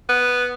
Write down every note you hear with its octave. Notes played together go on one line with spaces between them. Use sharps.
B3